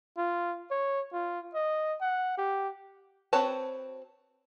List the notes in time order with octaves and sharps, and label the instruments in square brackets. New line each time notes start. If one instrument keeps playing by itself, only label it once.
[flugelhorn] F4
C#5
F4
D#5
F#5
G4
[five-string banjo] C4 F#4 B4 C#5 A5